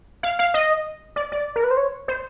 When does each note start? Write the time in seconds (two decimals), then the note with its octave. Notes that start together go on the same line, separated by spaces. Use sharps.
0.23 F5
0.39 F5
0.54 D#5
1.16 D5
1.32 D5
1.56 A#4
1.64 B4
1.71 C5
1.77 C#5
2.08 C5